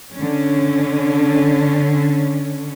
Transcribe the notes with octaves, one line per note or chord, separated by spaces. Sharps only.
D3 C#4